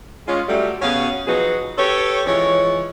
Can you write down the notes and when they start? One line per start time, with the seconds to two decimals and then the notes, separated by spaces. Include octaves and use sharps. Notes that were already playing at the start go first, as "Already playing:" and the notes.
0.28 G#3 C#4 F4
0.48 F#3 G3 A3
0.81 B2 C#4 F#4 G#4 C#5 F5
1.27 F3 F#3 D#4 F#4 G#4 B4
1.78 G4 A4 B4 C#5
2.26 E3 F3 G#3 C#5